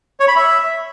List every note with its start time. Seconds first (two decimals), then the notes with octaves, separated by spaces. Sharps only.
0.20 C#5
0.28 B5
0.36 E5